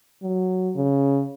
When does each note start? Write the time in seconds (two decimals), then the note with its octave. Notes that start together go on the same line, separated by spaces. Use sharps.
0.23 F#3
0.76 C#3